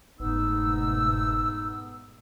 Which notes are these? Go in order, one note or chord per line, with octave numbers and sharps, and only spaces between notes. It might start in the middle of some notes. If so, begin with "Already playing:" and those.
F#1 G#2 B2 A3 B3 D#4 E6